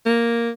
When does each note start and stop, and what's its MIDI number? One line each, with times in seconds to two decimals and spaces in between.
0.06 0.50 58